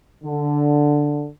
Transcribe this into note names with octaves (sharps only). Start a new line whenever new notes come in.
D3